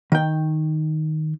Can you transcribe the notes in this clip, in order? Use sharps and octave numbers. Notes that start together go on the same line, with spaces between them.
D#3 G5